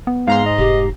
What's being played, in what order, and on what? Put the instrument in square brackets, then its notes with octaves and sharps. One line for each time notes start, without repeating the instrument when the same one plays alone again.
[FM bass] B3
[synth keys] G#2 A#5 C6 [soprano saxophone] F5
[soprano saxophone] D#5
[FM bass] F1 [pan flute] G4